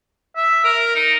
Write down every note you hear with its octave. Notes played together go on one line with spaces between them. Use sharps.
E5
A#4
D#4